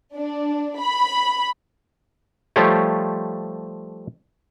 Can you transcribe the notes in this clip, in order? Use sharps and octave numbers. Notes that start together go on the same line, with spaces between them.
D4
B5
F3 G3 A3 F4 G4 C#5